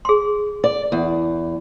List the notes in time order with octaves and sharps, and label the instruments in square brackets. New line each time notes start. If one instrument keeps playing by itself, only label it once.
[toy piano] G#4 C6
[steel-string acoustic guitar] D5
E2